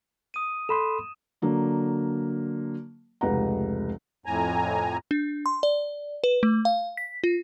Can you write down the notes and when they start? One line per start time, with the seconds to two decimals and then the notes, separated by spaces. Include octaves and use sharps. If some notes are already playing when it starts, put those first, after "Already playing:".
0.34 D#6 D#7
0.69 A4 B5 C6 E7
1.42 D3 F#3 A#3 D4
3.21 F1 C#2 G4 B4 F#5 A#5
4.26 F2 A2 G#5 A#5
5.11 D4
5.46 C6
5.63 D5
6.24 B4
6.43 A3
6.65 F5
6.97 B6
7.24 F4